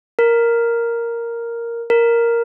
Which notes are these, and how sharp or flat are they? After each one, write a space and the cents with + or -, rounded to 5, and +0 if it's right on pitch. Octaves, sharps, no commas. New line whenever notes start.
A#4 +0
A#4 +0